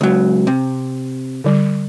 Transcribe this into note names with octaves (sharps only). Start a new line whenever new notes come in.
C#2 F#3
C3
D3 G3